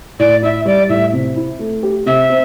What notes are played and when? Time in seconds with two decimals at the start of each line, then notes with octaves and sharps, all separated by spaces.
0.19 A2 D5
0.42 E4 E5
0.65 G3 D5
0.89 A2 E5
1.13 C3
1.36 E4
1.59 A3
1.83 G4
2.06 C3 E5
2.30 C4